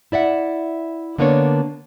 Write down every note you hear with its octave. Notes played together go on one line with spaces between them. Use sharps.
E4 D5 E5 F#5
D3 A#3 B3 D4 A#4 C#5